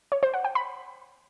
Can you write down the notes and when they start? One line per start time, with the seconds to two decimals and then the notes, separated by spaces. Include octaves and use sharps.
0.12 C#5
0.23 C5
0.34 F#5
0.44 G5
0.55 B5